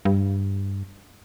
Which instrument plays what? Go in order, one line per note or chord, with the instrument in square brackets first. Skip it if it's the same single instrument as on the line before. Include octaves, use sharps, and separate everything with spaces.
[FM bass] G2